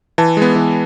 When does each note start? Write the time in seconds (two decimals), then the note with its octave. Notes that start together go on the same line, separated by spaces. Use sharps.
0.18 E3 A5
0.37 G#3 B3
0.56 E3